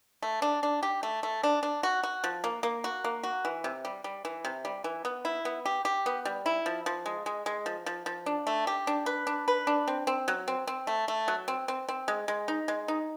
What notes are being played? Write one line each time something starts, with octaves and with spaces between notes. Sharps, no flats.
A3
D4
D4
G4
A3
A3
D4
D4
F#4
F#4
F3
A#3
A#3
F#4
A#3
F#4
E3
C3
G3
G3
E3
C3
G3
E3
B3
E4
B3
G4
G4
B3
G3
E4
F3
F3
G#3
G#3
G#3
F3
F3
F3
D4
A3
G4
D4
B4
D4
B4
D4
C4
C4
F#3
C4
C4
A3
A3
F#3
C4
C4
C4
G#3
G#3
D#4
G#3
D#4